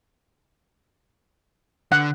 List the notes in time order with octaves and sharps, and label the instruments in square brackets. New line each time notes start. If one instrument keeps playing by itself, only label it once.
[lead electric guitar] D3 [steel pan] F#5